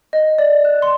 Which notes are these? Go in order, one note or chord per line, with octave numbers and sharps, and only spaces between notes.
D#5
D5
F#6
C6